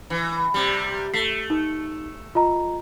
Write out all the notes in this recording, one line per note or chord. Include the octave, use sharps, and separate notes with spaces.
E3
C3 G3
A3 B6 C7
D#4
F4 D#5 A#5